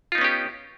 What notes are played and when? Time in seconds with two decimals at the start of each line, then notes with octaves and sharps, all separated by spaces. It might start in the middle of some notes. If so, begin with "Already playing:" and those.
0.12 F4
0.15 D#4
0.18 B3
0.21 C#4
0.24 G4